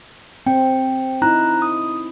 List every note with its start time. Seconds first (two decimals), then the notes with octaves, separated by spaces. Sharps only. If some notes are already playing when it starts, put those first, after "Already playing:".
0.46 C4 G5
1.22 D#4 E4 A#5 F#6
1.62 D#6